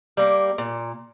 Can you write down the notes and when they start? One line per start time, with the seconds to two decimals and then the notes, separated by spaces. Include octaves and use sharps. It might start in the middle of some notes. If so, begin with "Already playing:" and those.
0.17 G3 A#3
0.58 A#2